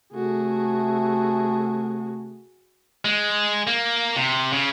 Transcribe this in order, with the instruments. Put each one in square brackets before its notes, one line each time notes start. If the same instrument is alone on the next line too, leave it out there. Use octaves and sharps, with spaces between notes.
[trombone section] C3 A3 [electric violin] F#4 G#4
[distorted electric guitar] G#3
A#3
C3
C#3